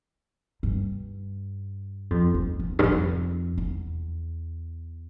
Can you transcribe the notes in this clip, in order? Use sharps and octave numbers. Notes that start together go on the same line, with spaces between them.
G2
F2
F2
E2
G2
F2
E2